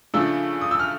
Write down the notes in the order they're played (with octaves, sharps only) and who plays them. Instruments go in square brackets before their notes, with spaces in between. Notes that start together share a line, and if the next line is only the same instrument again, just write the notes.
[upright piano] C#3 F3 A3 D4 E6
D#6
E6
F6